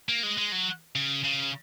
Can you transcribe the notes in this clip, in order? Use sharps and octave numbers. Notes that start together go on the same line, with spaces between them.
A#3
G#3
G#3
F#3
C#3
C#3